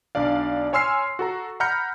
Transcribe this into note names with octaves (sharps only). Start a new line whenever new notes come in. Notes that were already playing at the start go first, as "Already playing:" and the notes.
B1 D4 D5 F5
C#5 G#5 C6 E6 F6 C7
F#4 A4 A#5
F#5 A#5 B5 F6 G6 C#7